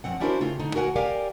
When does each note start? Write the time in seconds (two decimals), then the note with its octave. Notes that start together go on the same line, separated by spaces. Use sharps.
0.04 F#2 F3 C4 F#5
0.20 C#4 D4 E4 F#4 A#4 C5
0.41 C#3 A3 C4 F4
0.59 D3 D#4
0.74 D2 F#4 A#4 E5 F#5 G#5
0.96 G4 A#4 D5 F5 G#5